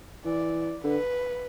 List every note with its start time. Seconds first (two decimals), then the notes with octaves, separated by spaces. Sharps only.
0.25 E3 D5
0.84 D3 B4